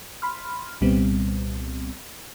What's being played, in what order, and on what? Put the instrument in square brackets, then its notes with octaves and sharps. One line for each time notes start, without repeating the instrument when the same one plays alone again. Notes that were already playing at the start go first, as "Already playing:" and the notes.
[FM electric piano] B5 C6 F6
C2 A#2 G3 B3 C4